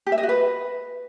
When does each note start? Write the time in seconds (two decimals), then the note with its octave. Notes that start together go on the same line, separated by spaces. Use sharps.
0.07 G4
0.12 E5
0.18 D#5
0.23 F#4
0.29 B4